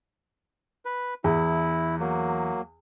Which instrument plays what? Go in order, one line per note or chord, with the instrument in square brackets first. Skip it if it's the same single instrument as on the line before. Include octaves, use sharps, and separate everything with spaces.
[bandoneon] B4
[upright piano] E2 [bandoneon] E4
[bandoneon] F#3 A#3